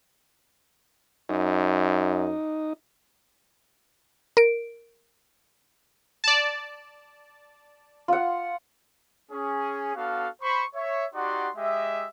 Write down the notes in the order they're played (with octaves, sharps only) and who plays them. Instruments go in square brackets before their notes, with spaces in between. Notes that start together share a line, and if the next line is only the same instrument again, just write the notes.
[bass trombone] F#2 [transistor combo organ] D#4
[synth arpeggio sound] A#4 D7
[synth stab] D5 A5
[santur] F4 F#5
[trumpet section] C#4 G#4
B3 D4 F#4 A4 F5
C5 B5 C#6
C#5 E5
D#4 F#4 G4 D5 F#5 C6
G#3 G4 D#5 E5